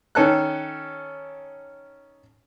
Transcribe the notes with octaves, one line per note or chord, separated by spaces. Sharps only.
D#3 C#4 A4 F#6